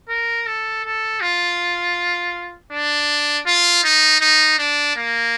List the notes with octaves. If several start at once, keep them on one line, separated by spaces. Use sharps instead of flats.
A#4
A4
A4
F4
D4
F4
D#4
D#4
D4
A#3